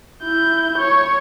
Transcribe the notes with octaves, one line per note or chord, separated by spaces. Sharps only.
E4 G6
C#5